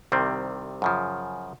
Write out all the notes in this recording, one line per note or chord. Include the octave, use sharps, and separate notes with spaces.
C2 C3 D#3 G3 C4
F#2 C#3 F3